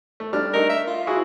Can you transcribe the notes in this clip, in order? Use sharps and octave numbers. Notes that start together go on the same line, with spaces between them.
A3
G3 D4 F6
A3 D#4 A4 A#4
E5
F4
E4 F#4 G#4